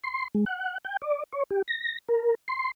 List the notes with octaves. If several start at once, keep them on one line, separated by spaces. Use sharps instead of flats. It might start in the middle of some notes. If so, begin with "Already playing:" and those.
C6
G#3
F#5
G5
D5
C#5
G4
A#6
A#4
C6